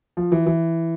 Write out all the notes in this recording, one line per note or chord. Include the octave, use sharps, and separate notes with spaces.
F3
E3
E3